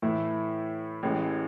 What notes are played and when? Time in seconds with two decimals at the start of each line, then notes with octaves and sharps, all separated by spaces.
0.02 A2 E3 A3 E4
1.03 A1 A2 E3 G#3